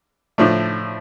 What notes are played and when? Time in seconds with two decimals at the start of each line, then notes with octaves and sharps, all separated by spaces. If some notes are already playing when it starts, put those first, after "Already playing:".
0.38 A2 F3 A3 D4